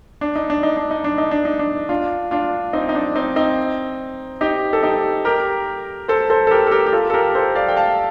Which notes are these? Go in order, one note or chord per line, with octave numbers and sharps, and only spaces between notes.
D4
D#4
D4
D#4
D4
D#4
D4
D#4
D4
D#4
D4
D4 F4
D4 F4
C4 D#4
D#4
D4
C4 D#4
C4 D#4
D#4 G4
A4
D#4 G4
G4 A#4
A4 C5
A4 C5
A4
G4 A#4
A4
G4 A#4
G4
F4 A4
A4
G4 A#4
A4 C5
D5 F5
G5
F5 A5